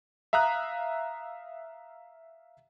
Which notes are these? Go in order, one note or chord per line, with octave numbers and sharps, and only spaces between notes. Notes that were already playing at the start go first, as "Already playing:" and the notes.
E5 F5 A#5 D#6 F#6